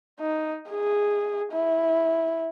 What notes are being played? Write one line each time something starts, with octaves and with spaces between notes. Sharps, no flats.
D#4
G#4
E4